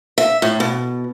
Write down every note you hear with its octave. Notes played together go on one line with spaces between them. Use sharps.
E5
A2
B2